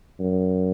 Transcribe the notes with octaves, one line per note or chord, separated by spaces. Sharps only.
F#2